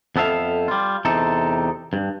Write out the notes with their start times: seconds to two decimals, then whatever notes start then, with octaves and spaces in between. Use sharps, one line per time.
0.16 F2 B3 A4 E5 F5
0.68 G3 F4
1.05 E2 C3 D#4 A4
1.93 G2